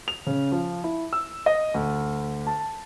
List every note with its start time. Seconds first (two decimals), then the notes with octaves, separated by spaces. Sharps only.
0.08 F7
0.26 C#3
0.52 F3
0.84 E4
1.13 E6
1.46 D#5
1.74 D2
2.47 A5